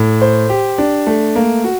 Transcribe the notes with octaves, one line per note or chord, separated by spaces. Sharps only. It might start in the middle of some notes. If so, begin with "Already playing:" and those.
Already playing: A2
C5
G4
D4
A3
A#3
F#4